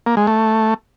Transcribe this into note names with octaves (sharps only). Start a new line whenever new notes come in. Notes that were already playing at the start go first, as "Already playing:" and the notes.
A#3
G#3
A3